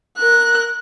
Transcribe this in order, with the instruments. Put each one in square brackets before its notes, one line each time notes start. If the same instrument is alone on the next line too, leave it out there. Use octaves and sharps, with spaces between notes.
[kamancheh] A#4 F#6